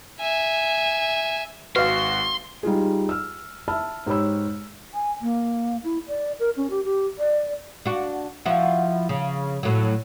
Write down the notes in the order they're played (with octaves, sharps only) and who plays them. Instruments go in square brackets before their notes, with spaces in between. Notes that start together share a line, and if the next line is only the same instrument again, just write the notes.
[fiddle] E5 G#5
[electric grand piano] G#1 F#4 [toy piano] B4 F5 [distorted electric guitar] C6
[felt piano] G3 D#4 F4 G#4
E6 F6
E5 A5 B5 E6 F6
G#2 G4 C#5 B5 E6
[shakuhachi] G#5
A#3
E4
D5
A#4
C#4
G4
G4
D5
[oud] D4 F#4
F3 E4 F#4
C#3
A2 F#3